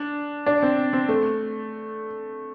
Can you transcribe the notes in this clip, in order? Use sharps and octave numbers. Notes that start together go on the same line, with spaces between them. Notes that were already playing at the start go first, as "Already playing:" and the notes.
Already playing: D4
D4
C4
C4
A3